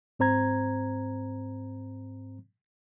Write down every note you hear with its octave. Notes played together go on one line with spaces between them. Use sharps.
G#2 C4 C5 A#5 G#6